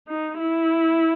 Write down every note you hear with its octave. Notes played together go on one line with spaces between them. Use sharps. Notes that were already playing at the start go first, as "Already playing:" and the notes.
D#4
E4